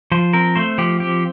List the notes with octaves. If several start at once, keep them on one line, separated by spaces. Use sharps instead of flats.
F3 C5
C4 A#4
A3 C5
F3 G4
C4 G4